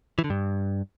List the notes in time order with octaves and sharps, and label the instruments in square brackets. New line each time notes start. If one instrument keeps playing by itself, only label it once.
[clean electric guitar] E3
D3
G2